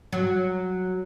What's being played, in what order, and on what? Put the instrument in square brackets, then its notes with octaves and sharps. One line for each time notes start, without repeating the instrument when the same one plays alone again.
[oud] F#3